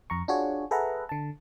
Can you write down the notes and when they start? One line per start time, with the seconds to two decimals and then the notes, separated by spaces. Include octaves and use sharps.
0.10 F2 A#5 C#6
0.28 D4 F4 F#4 G#4 C#5
0.71 G#4 A4 B4 E5 F#5 A#5
1.09 D3 A5